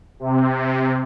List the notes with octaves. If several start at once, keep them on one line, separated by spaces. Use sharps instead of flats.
C3